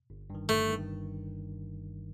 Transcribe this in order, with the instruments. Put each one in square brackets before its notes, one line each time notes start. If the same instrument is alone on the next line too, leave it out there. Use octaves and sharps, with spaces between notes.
[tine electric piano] G1
G2 D#3
[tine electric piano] G1 [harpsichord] A3
[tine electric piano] G2 D#3